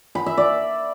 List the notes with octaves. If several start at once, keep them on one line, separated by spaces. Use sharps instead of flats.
B5
E5
D5